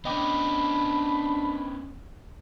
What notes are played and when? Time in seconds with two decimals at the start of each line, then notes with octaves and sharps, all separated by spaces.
0.05 B3 C#4 D4 D#5 G5 B5 D6